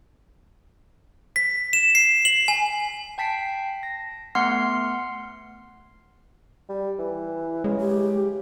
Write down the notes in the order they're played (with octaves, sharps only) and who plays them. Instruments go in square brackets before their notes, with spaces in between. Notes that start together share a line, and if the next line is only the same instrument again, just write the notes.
[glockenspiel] B6
E7
C7
F#7
G#5
[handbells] G5 A5 B6 C7 D7
A#6
A3 B3 F#5 C6 F6 C7
[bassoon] G3
E3
[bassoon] C#3 [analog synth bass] G#3
[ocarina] G4